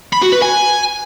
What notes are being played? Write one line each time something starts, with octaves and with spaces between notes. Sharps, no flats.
B5
F#4
B4
G#5